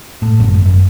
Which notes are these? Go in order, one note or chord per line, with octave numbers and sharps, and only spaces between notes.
A2
G#1 F#2
F#2